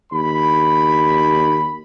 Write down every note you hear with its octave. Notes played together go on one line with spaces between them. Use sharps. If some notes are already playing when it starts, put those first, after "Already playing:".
D#2 B5